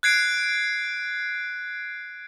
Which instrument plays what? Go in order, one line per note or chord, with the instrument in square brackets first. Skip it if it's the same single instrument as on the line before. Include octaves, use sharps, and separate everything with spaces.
[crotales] F#6 G#6 C7 D7